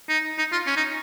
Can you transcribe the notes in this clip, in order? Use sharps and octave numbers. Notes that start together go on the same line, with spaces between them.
D#4
D#4
F4
C#4
D#4